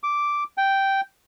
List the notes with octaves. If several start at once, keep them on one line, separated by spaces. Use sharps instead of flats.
D6
G5